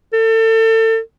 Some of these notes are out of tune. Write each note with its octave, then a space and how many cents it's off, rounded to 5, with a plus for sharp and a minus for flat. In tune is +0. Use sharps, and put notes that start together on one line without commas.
A4 +30